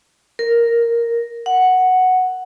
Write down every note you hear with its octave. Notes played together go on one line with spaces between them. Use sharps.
A#4
F#5